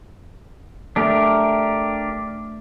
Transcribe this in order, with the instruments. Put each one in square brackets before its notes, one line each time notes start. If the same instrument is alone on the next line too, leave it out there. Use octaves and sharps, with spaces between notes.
[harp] A3 [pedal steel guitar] D4 G4 A#4